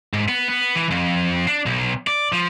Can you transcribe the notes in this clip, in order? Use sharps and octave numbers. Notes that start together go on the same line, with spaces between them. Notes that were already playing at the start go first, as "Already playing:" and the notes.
G#2
B3
B3
E3
F2
D4
B1
D5
F3